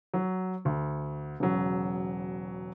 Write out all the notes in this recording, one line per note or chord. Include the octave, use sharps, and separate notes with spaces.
F#3
D2
E1 C#3 F#3